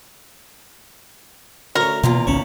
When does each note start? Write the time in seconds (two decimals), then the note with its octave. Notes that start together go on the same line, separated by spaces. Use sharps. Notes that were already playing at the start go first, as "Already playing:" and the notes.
1.75 D2 C#4 A#4
2.03 E2 B2 D#3 A#3 F4
2.27 G#1 C#2 C#4 C#5 A5 B5